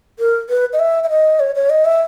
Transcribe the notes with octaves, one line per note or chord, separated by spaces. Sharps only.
A#4
B4
D#5
E5
E5
D#5
C#5
C#5
D#5
E5